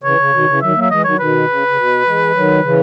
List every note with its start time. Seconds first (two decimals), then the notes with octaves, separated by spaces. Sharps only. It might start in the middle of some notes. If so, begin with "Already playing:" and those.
0.03 C#3 E3 C#5
0.18 C#3
0.32 B2 D#3
0.47 C#3 E3
0.61 D#3 F#3 E5
0.76 F#3 A#3
0.82 E5
0.90 E3 G#3 D#5
1.04 D#3 F#3 C#5
1.19 B2 D#3 B4
1.48 C#3
1.68 C#3
1.77 B2
2.06 E3 G#3
2.34 D#3 F#3
2.63 C#3 E3